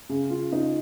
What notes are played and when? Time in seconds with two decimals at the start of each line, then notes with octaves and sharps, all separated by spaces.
0.09 C#3 G#4
0.30 F4
0.52 C#3 D#4